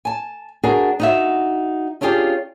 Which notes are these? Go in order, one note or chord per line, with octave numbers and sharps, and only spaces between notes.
G#5 A5
D4 F#4 G#4 A#4
D#4 F#4 E5
C#4 D4 F4 G4 G#4 D5